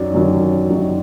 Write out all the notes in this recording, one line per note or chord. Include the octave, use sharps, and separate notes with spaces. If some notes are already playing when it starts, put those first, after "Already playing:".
Already playing: F#2 D#3 F#3 D5
F#2 D#3 F#3
F#2 D#3 F#3